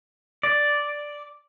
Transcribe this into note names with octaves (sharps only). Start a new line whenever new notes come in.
D5